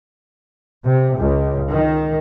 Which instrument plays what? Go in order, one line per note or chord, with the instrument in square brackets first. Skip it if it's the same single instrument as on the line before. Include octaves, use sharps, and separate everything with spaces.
[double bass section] C3
C#2
D#3